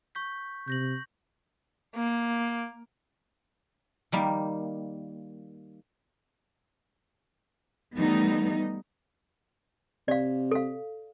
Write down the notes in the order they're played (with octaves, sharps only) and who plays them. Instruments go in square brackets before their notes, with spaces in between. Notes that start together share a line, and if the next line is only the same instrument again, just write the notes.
[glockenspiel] C#6 G6 B6
[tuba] C3 [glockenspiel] G6 A#6 F#7
[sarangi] A#3
[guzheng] D#3 G3 A#3
[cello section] D#3 E3 G3 A3 B3 D#4
[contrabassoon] C3 [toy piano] D5 F5
[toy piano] A4 F5